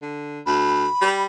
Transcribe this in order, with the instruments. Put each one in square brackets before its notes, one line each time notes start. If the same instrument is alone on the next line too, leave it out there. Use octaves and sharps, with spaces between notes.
[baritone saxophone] D3
[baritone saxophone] D2 [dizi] B5
[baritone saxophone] G3